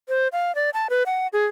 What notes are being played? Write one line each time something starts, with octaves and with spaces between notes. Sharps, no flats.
C5
F5
D5
A5
B4
F#5
G#4